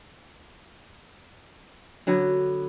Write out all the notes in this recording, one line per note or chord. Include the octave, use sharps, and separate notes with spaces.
D3 F#3 B3